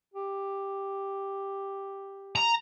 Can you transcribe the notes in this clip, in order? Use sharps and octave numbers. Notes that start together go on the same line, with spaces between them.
G4
A#5